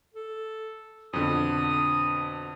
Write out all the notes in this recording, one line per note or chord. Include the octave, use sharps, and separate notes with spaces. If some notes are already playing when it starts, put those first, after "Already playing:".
A4
F2 B2 D3 D#6